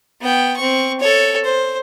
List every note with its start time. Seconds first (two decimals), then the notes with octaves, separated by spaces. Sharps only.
0.21 B3 G5
0.56 C4 C#6
1.00 A4 C#5
1.44 C5